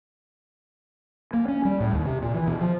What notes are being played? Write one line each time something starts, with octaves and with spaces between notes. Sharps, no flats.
A#3
C#4
G3
A2
D#2
C3
A#2
E3
B2
F3